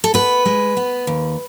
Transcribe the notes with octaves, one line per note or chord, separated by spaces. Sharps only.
A4
B3 B4
G#3
B3
D#2